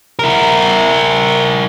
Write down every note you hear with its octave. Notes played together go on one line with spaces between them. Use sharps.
E4 A#4